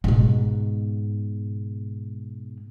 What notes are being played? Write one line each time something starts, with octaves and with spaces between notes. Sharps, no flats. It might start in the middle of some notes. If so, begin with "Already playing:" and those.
G#2 B2